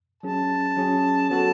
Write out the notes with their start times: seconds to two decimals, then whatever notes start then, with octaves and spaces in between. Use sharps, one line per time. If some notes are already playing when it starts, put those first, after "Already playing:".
0.23 F#3 C#4 G#4 A5
0.77 F#3 C#4 G#4
1.30 F#3 B3 F#4 A4 A5